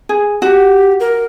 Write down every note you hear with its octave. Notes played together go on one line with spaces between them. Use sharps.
G#4
F#4 G4
A#4